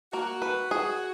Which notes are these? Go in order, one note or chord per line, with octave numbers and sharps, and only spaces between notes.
A#3 F#4
B4
G#4